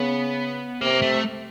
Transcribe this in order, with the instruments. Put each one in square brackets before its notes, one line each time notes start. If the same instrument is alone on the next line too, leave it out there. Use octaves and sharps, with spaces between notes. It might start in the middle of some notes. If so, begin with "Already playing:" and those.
Already playing: [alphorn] C#3 [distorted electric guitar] B3
[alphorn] C3 [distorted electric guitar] A#3
[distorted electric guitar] A3